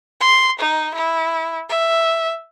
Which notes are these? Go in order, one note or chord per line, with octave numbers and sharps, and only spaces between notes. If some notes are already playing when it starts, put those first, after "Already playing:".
C6
D#4
E4
E5